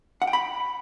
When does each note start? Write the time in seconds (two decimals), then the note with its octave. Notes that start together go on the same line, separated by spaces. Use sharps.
0.22 F#5
0.27 G5
0.33 B5